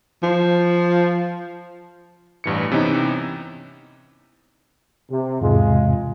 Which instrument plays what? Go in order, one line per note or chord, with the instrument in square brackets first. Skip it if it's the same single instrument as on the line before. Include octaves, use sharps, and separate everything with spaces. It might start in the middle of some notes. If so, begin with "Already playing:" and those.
[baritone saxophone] F3
[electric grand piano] A1 G2 E3 C#7
C3 E3 B3 C#4 D#4
[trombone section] C3
[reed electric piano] E2 G#2 C3 [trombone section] G#3 F4